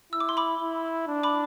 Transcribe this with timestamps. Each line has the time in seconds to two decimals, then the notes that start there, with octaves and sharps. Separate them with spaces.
0.13 E4 E6
0.20 D6
0.29 C6
0.37 B5 D6
0.60 E4
1.08 D4
1.23 B5 D6